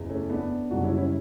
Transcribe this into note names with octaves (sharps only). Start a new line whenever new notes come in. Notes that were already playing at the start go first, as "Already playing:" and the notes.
Already playing: F#1 E2
A3 C#4
B3 D4
F#1 F#2 C#3 G3 D4 F#4
C#4 E4
C#4 E4